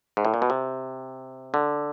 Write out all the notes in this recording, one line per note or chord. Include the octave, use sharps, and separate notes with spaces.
G#2
A2
A#2
B2
C3
D3